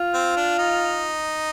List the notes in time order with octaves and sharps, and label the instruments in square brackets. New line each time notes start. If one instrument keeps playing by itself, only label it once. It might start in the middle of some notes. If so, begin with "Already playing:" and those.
Already playing: [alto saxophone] F4
[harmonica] C4
D4
D#4